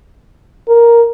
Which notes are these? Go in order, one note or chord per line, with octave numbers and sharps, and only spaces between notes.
A#4